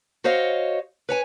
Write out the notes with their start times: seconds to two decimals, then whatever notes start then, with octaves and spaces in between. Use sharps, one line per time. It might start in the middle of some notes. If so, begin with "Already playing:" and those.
0.24 F#4 C5 C#5 D#5 F5
1.09 B4 C#5 G#5